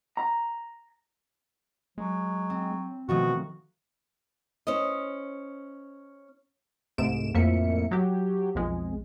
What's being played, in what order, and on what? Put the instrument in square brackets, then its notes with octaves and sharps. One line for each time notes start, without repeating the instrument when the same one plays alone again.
[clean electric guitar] A#5
[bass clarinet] F#3 [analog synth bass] G#3
[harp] C4
[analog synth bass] B2 [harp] D#3 F3 A3 [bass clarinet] F#4
[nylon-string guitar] C#4 C5 D#5
[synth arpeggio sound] C2 G#2 C3 A3 D7 E7
F2 A2 A#3 E5 C#7
F#3 G4
B1 F2 G#3